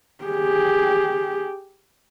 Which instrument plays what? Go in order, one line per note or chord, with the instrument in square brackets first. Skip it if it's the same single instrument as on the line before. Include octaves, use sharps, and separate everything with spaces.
[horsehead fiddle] G4 G#4